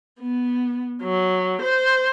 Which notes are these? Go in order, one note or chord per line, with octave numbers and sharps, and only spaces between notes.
B3
F#3
C5